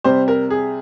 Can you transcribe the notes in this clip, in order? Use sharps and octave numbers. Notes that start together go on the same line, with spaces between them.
C3 G3 C4 C5
A#4
G#4